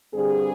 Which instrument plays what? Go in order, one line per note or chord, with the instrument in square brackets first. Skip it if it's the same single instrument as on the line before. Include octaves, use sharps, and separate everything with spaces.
[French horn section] G2 D3 G3 C4 G#4